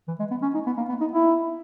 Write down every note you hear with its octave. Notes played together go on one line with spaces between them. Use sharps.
E3
G#3
B3
C#4
D#4
B3
A#3
B3
D#4
E4